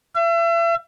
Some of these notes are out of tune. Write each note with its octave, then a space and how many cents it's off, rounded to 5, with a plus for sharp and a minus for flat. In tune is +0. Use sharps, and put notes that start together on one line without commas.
E5 +40